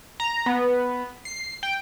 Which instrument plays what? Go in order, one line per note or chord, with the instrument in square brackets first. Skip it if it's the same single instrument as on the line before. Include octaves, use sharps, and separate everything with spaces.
[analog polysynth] A#5
B3
C7
G5